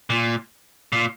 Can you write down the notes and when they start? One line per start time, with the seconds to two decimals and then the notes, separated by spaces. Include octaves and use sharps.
0.10 A#2
0.92 A#2